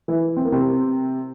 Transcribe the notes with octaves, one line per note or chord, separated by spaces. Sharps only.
E3 E4
C4
A#3
C3 C4